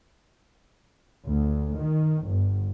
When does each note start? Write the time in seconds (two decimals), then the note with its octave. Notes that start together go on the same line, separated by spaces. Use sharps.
1.26 D2
1.77 D#3
2.27 G1